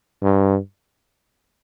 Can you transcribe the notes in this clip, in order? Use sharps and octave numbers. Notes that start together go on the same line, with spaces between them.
G2